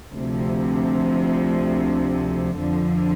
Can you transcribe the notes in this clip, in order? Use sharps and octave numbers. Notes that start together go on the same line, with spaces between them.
D2 C3 F3
F2 D3 F3